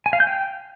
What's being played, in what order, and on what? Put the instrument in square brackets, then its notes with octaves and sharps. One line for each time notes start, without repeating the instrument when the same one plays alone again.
[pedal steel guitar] G#5
F5
G6
G5